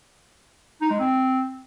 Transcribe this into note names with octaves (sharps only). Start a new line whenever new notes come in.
D#4
G#3
C4